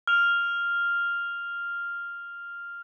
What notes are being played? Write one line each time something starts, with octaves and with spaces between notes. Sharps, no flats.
F6 F7